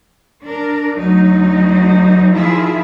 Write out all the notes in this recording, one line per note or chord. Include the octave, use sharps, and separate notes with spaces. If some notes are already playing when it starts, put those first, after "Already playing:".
D4 A#4
D2 F#3 D#4
D#3 F3 E4 F4 G#4 E5